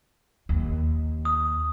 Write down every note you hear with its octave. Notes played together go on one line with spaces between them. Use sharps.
D#2
D#6